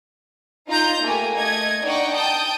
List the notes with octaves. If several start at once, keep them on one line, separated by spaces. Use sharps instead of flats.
D#4 F4 A#5 G6
A3 A#3 G4 G#5
A3 D#5 G#6
D4 D#4 D5 F#5 G5 C#6
G5 A5 D#6 G6